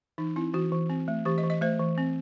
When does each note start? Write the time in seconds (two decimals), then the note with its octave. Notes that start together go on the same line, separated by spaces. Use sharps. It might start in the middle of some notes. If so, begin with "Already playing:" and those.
0.18 E3 D#4
0.36 C4 E4
0.54 E3 F#4
0.72 E3
0.90 C4
1.08 A3
1.25 E3 G4
1.38 D#5
1.44 E3
1.50 D#5
1.61 A3 C5
1.79 E3
1.98 C4